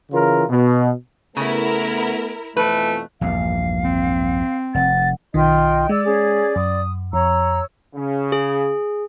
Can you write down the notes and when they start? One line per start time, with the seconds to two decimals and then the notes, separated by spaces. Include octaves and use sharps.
0.12 C#3 E3 F4 A#4
0.49 B2
1.37 C#3 A3 B3 E4 A#4
2.57 F2 B2 E3 A3 B4
3.21 A#1 E2 G2 F5
3.84 C4
4.75 F1 F#5 A6
5.34 B1 D#3 F4 D#5 G5
5.89 G#3 D5 E6
6.04 C#4 G#4
6.56 F#2 D#6
7.13 F2 C#5 A#5 E6
7.95 C#3
8.32 G#4